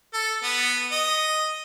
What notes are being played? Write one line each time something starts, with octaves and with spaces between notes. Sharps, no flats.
A4
B3
D#5